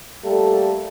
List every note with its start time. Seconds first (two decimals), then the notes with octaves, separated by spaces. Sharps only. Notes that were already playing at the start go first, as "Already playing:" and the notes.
0.24 G3 A3 A#3 A4